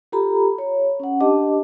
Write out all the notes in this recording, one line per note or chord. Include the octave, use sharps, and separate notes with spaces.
F4 G4 A4 A#5 B5
C#5
C#4 F#5
D4 G4 D#5 A5 D6